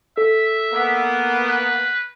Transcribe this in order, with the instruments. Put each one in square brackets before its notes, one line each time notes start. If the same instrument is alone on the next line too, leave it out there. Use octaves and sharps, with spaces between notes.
[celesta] A4 [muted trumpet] E5
[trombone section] A#3 B3
[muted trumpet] B4